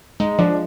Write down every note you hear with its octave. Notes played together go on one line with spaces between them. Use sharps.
G#3 D#4
F3 D4